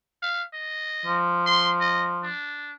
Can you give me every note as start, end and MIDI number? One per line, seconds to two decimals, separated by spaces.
0.22 0.43 77
0.53 1.17 75
1.06 2.31 53
1.46 1.69 84
1.81 2.07 75
2.23 2.72 62